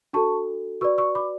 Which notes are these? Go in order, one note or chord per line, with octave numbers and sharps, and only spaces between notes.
D4 F#4 A4 A5 C#6
F#4 B4 D5 C#6 E6
C#6 E6
B5 D6